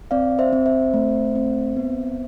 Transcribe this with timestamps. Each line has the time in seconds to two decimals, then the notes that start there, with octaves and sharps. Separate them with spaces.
0.11 C4 D5 F5
0.39 C5 E5
0.53 C4
0.66 C5 E5
0.94 A3
1.35 C4
1.77 B3